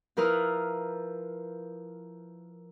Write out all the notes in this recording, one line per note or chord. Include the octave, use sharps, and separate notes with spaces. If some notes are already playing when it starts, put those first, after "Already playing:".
F3 E4 A#4 B4 D#6 F6